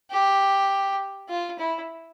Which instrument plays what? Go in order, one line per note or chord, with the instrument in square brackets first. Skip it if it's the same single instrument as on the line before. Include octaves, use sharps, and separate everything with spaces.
[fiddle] G4
F4
E4